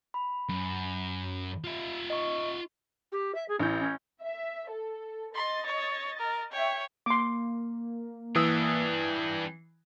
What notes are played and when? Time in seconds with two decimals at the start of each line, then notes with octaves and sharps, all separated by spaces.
0.14 B5
0.49 F#2
1.64 F4 E5
2.10 D#5 C#6
3.12 G4
3.35 E5
3.48 G#4
3.60 A1 E3 C#4 G6
3.79 C#4
4.21 E5
4.69 A4
5.35 D#5 C6 A6
5.66 C#5
6.19 A#4
6.52 C#5 E5 G5
7.06 A#3 C6 D6
8.36 E3 G3 D4 D#6 E6